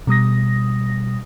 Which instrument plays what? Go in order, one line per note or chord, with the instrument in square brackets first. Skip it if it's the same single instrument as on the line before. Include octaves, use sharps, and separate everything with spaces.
[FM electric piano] B2 G3 D#6 A#6